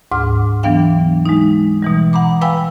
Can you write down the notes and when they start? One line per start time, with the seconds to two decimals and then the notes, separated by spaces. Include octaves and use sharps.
0.11 D2 G#2 D6 F6
0.63 E3 F#3 B3 D4 F5 G5
1.26 G#3 D#4
1.82 B2 E3 G3
2.13 F#5 A#5 B5 D6
2.41 B4 F5 G5 G#5 B5 E6